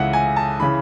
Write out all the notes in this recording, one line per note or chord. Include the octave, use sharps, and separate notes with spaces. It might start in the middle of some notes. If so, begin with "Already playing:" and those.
Already playing: C#2 C#3 E3 E5 F#5
G#5
A5
C#3 E3 B5